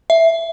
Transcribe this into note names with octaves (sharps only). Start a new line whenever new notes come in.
E5